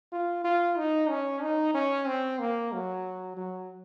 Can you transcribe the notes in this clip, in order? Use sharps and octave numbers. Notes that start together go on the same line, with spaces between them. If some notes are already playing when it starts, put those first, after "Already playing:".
F4
F4
D#4
C#4
D#4
C#4
C4
A#3
F#3
F#3